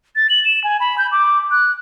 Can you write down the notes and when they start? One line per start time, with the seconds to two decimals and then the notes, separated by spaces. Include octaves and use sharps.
0.16 A6
0.30 F#7
0.45 E7
0.64 G#5
0.80 B5
0.98 G6
1.12 D6
1.51 F#6